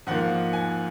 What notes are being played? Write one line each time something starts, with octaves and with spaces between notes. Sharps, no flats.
G#2 F3 A#3 F#5
G#5